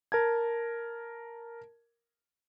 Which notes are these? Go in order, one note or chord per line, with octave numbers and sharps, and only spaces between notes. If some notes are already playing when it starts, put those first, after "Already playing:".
A#4 A5 G#6